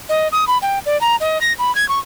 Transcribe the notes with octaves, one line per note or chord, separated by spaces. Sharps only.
D#5
D#6
B5
G5
D5
A#5
D#5
A#6
B5
G#6
C#6